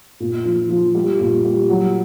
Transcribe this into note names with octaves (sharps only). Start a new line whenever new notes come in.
A#2
F3
F3
G3
A#2
G3
F#3